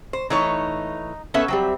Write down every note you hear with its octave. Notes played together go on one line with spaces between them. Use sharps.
C5
E3 A3 D#4 C#5
B3 C#4 A4 E5
F#3 G3 C4 E5